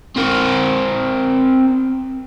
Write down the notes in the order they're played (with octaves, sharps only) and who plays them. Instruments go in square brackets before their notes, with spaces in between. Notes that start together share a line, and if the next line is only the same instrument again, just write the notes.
[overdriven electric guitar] C4 A#4